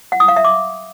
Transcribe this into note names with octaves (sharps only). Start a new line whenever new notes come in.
F#5
D#6
F5
E5
D6